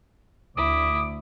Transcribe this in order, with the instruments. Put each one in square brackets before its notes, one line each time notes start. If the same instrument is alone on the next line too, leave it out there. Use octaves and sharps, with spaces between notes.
[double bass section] D2 [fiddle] E4 [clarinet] D6 [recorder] D#6